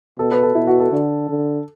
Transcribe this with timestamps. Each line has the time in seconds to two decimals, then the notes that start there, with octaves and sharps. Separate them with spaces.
0.19 B2 A4
0.31 B4
0.43 A4
0.55 B2 E4
0.67 F#4
0.80 A4
0.92 D3
1.29 D3